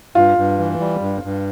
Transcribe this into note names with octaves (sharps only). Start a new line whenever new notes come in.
G2 F4
G2
E3
G3
G2
G2